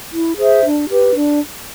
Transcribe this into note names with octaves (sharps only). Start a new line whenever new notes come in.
E4
G#4 C5 E5
D4
G4 B4
D4